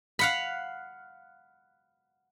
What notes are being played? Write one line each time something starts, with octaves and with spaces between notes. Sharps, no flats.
F5 F#5 B5